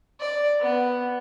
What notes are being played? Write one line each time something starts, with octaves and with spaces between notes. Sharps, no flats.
D5
B3